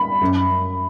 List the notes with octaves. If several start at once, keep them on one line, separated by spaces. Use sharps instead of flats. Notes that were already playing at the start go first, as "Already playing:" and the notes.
Already playing: B5
F#2